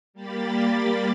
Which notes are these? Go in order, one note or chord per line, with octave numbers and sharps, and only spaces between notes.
G3 A#3 G4 B5 A6